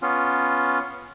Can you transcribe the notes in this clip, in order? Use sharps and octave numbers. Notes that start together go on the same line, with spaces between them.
B3 C#4 F4